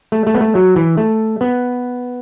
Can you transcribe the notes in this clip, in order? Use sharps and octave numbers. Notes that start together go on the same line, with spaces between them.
A3
A3
B3
A3
F#3
E3
A3
B3